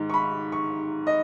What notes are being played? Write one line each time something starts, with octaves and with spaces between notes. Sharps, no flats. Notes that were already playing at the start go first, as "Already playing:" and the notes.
Already playing: G#2 D#3
C#6
B5
C#6
D#5